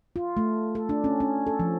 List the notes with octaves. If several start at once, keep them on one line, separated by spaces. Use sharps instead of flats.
F4
A3
A4
D4
C#4
C#4
A4
F3